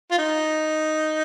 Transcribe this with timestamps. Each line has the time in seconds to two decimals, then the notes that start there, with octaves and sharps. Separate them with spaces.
0.11 F4
0.18 D#4